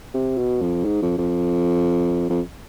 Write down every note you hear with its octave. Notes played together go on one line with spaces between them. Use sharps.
C3
B2
F2
G#2
F2
F2
F2